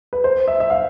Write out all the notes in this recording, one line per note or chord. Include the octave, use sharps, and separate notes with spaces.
B4
C5
E5
E5
F5